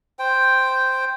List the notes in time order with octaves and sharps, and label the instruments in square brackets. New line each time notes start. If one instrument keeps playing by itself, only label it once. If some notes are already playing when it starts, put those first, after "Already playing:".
[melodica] C5 G5